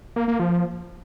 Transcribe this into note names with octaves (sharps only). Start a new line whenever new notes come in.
A#3
A#3
F3